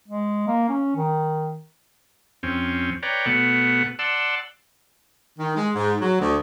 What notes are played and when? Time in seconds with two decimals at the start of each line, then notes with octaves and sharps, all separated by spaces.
0.08 G#3
0.48 A#3
0.69 C#4
0.96 D#3
2.43 F2 C4 C#4
3.03 B4 C#5 D5 G5 A#5
3.26 B2 A3 B3 F#5
3.99 D5 F#5 A5 C6 E6
5.39 D#3
5.56 G#3
5.75 G#2
6.01 F#3
6.20 D2